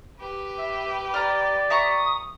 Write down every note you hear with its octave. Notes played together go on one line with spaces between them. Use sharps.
G4 B4
E5
D5 A#5 F6
E5 A#5 C#6 D#6